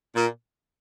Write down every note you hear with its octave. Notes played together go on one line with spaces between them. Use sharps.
A#2